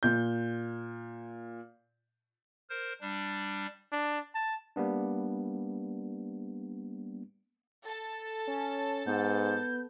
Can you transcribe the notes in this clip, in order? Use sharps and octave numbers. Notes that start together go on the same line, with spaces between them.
A#2 G6
A#4 C5
G3 D4
D4
A5
G3 A#3 B3 D4
A4 A5 A6
C#4
G#2 B3 G6